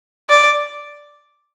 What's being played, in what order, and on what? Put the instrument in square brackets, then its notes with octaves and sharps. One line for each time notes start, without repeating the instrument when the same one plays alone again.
[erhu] D5